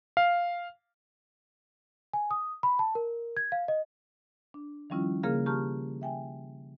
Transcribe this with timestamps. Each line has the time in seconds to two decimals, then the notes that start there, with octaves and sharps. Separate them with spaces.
0.17 F5
2.13 G#5
2.31 D#6
2.63 B5
2.79 A5
2.95 A#4
3.37 G#6
3.52 F5
3.68 D#5
4.54 D4
4.90 D#3 F3 G3 C#4 E4 F4
5.23 C#3 A#3 G#4 A#4 F5 F6
5.46 G4 A5 A#5 C#6 F6
6.01 E5 G5 G#5